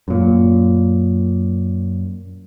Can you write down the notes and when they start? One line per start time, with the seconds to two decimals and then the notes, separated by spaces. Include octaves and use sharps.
0.08 F#2 A#2